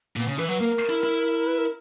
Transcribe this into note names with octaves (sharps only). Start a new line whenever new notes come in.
A#2 B3
C#3 C#4
E3 B4
F#3 B4
A#3 A#4
E4
E4
B4
A#4